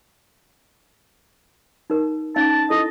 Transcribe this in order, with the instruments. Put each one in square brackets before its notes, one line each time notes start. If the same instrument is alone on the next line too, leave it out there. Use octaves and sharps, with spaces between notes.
[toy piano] D#4 A#4
[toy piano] C#4 D#4 F5 [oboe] A5
[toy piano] E4 A4 [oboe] D#5